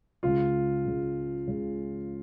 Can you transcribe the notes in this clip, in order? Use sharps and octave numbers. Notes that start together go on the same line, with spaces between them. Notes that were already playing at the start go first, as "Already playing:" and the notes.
C#2 C#3 G#3 F4
C#2 C#3 G#3
C#2 C#3 G#3